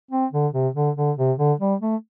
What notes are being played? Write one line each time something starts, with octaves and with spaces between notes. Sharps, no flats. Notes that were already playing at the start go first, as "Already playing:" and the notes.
C4
D3
C3
D3
D3
C3
D3
G3
A3